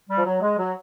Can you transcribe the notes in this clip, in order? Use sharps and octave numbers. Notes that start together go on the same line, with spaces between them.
G3
F3
F#3
G#3
F#3